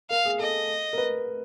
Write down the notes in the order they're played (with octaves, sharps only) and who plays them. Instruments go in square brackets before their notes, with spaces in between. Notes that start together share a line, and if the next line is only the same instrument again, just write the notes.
[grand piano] A#4 [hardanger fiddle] F5
[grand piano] G#4
[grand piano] A4 [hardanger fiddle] D#5
[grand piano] A#4
B4